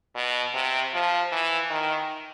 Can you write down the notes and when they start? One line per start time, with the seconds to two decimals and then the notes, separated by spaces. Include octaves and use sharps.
0.16 B2
0.55 C3
0.94 F3
1.32 E3
1.71 D#3